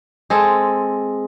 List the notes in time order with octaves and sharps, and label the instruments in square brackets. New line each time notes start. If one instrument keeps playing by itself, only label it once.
[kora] G#3 C4 A4